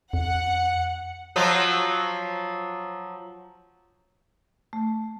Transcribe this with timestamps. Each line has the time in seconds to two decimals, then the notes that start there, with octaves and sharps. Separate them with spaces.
0.13 F2 F#5
1.36 F3 F#3 F4
4.73 A3